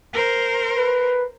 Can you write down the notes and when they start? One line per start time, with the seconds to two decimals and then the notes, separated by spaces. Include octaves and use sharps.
0.14 A#4 C5
0.76 B4